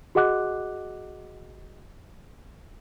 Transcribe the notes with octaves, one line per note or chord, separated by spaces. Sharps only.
F#4 G#4 D#5 F#5 D6 F#6